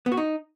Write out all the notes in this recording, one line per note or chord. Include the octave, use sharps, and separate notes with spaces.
B3
F#4
D#4